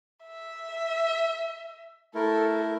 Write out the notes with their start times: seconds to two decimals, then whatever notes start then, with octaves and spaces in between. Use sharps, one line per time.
0.24 E5
2.15 A3 E4 A4 A#4